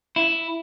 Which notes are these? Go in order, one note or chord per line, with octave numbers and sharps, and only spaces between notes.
E4